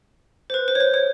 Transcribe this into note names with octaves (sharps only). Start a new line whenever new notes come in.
C5
B4
C5
C#5
C5
C#5